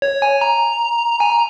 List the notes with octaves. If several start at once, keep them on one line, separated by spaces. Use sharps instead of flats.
C#5
G#5
A#5
G#5
A#5